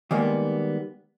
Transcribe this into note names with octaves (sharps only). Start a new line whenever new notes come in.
D#3 G3 G#3 A#3 B3